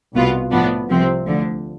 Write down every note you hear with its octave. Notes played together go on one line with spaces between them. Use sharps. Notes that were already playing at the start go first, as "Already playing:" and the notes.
C2 B2 B3 F4
A2 F3 B3 D4
C2 C3 F3 C4
D2 D3 F3